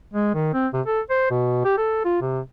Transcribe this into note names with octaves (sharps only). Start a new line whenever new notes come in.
G#3
D#3
C4
C3
A4
C5
B2
G4
A4
F4
C3